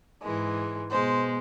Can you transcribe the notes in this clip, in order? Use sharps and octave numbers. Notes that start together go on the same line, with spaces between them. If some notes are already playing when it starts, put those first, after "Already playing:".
G#2 E3 G#3
B2 G#3 C5